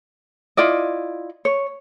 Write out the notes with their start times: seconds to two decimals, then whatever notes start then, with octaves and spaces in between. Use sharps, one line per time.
0.57 E4 F4 D5 D#5
1.45 C#5